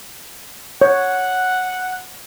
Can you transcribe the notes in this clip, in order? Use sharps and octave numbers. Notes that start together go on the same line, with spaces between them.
C#5 F#5